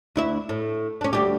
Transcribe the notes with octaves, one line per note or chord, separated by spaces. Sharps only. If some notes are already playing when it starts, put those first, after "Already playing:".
D2 E4 E5
A2
C#4 D4
D2 G3 G4